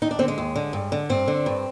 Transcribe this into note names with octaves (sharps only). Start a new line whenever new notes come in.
D#2 D#4
D4
D3 C4
G#3
D#2
D3
G2
D3
G2 C4
D3
G2